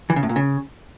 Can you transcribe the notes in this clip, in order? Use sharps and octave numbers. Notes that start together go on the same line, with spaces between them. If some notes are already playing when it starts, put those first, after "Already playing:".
E3
C#3
A2
A#2
C#3